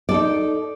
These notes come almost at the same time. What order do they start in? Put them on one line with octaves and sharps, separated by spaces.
D5 A4 D#4